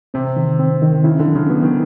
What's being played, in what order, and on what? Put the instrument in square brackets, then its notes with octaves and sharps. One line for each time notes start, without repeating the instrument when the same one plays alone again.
[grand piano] C3 [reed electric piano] C4
[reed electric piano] D#3
C4
D#3
[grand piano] C#3 [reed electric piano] E4
[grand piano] D3
[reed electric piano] F#3
[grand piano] C#3
[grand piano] E3 [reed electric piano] B3
[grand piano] D#3